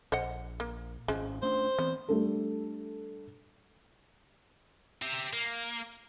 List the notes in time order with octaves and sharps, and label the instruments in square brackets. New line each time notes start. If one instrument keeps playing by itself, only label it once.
[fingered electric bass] A#1 [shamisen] C5 D#5 F#5
[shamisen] A#3
[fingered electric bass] G#1 C#4 [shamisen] F3 G#3
[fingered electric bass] A3 C#4 D4 [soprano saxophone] C5
[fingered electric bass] E3 C4 [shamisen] B3
[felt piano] G3 A3 D4 A4
[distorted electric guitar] G4 E5
A#3